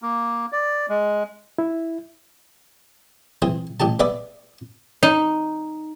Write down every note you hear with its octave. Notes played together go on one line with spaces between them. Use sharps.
A#3
D5
G#3
E4
E3 C4 G#4 C5
A1 G4 G#4 A5
B3 G#4 B4 D5 E5 D6
D#4